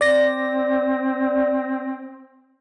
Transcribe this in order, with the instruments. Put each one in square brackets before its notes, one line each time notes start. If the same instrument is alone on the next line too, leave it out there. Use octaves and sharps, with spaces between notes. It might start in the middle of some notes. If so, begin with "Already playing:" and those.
[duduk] C4 [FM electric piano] D5 A#6